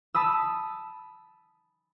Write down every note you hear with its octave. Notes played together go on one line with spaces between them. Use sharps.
A5 B5 D#6 E6